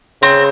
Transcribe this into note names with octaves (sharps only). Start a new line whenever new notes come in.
C#3 C4